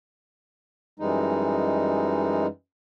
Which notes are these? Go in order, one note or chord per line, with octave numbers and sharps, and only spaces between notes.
F#2 E3 G3 G#3 D#4